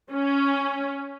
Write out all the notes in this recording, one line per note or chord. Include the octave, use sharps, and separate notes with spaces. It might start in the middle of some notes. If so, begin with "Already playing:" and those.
C#4